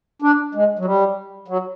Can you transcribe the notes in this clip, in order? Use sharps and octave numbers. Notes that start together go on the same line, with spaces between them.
D4
G#3
F#3
G3
F#3